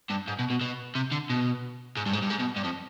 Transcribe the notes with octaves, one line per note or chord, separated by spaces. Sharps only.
G2
G#2
B2
B2
B2
C3
D3
B2
G#2
G2
G#2
G2
G#2
B2
G2
F2